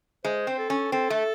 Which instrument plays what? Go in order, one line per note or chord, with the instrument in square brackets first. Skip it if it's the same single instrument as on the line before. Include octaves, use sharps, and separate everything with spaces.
[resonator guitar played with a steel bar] G#3 [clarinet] C5
[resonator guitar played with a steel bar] C4
[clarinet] A4
[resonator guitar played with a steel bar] C#4
[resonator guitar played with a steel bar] C4 [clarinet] A4
[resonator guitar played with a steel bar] A3